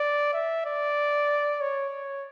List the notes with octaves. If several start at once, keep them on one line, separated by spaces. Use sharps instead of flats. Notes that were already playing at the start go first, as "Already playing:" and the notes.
Already playing: D5
E5
D5
C#5